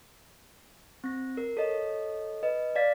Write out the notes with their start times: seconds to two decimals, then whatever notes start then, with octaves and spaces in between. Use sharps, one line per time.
1.04 C4 A#6
1.37 A#4
1.57 A4 C#5 D#5
2.43 B4 D#5
2.76 D5 F5 A6 B6